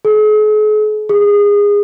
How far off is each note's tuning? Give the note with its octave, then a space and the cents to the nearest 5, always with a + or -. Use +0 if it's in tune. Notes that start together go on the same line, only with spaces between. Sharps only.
G#4 +45
G#4 -25